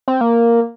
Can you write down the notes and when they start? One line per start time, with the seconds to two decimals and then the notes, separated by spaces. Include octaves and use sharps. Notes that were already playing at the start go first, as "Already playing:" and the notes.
0.08 C4
0.21 A#3